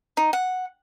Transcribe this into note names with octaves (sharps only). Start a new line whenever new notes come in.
D#4
F#5